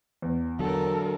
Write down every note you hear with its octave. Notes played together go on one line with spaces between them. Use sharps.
E2
D3 F#3 A4 A#4